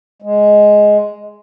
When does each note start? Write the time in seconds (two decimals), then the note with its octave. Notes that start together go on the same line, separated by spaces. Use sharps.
0.22 G#3